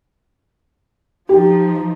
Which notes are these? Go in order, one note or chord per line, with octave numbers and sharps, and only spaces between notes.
F3 D#4 G4